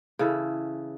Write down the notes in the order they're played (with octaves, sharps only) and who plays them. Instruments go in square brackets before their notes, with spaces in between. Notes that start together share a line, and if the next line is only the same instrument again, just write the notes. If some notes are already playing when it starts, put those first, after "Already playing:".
[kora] C#3 E3 A4